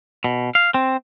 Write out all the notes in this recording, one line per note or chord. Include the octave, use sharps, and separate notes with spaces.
B2
F5
C4